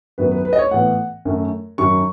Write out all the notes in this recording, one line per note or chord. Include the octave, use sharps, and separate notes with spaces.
F#2 D#3 F#3 B3 B4
B4
B4
D#5
C#5
A2 E3 B3 F#5
F#2 D#3 A3
F#2 D#3 F#3 C#6